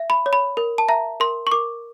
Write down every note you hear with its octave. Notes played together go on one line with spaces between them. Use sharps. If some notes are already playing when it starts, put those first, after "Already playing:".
Already playing: E5
B5
C#5
B5
A#4
A5
E5 A#5
A#4 C6
C#6
A#4 D6